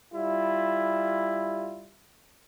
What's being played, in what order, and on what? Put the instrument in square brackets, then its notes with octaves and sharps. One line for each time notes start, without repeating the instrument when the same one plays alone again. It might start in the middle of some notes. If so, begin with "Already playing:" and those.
[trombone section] G3 E4 F4